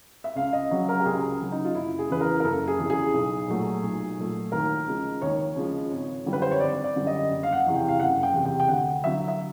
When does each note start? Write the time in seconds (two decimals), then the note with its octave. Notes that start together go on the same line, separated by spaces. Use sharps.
0.24 E5
0.36 C#2 F5
0.53 D#5
0.71 C#3 F#3
0.89 A#4
1.00 G4
1.06 C#2 G#4
1.40 C#3 F#3
1.52 D#4
1.64 F4
1.75 F#1 E4
1.99 G#4
2.09 E2 C#3 E3 B4
2.21 A#4
2.40 A#4
2.44 F#1 A4
2.68 G#4
2.79 E2 C#3 E3
2.90 G#4
3.14 B1
3.48 A#2 F#3 A3
3.83 B1
4.18 A#2 F#3 A3
4.52 D#2 A#4
4.88 C#3 F3 G#3
5.22 D#2 C#5
5.56 C#3 F3 G#3
5.91 G#1
6.26 F#2 D3 G3
6.33 B4
6.42 C5
6.51 C#5
6.60 G#1 D5
6.84 D5
6.95 F#2 D3 G3
7.07 D#5
7.29 F#1
7.43 F5
7.52 F#5
7.65 E2 C3 E3
7.76 G5
7.89 F5
8.00 F#1 F#5
8.23 G5
8.33 E2 C3 E3
8.45 G5
8.60 G5
8.69 D2 F#5
9.04 D3 F#3 E5
9.28 E5